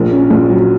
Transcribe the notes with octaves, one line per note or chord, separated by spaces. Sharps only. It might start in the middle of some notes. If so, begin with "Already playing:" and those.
Already playing: A#1 A#4
C#4
A#1
F#3